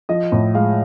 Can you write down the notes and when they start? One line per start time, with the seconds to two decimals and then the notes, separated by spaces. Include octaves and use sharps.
0.09 F3 D#5
0.32 A2
0.55 G#3 F5